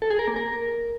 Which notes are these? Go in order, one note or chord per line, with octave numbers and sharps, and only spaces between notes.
A4
G#4
A#4
A#3
A#4